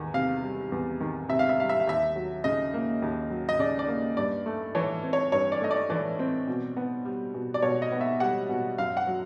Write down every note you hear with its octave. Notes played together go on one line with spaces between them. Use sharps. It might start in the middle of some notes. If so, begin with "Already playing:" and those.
Already playing: E2 D#3
C3 F5
G3
E2
D#3
C3 E5
F5
E5
G3 F5
E5
F5
D#2 E5
F#3
C#3 D#5
A#3
D#2
F#3
D#5
C#3 D5
D5
A#3
G2 D5
A3
E3 C#5
C4
C#5
G2 C#5
D5
A3 D#5
D5
E3 D5
C4
B2
B3
G3
B2
D5
B2 C#5
D#5
B3
E5
G3 F#5
B2
F#2 F5
F#5
F#3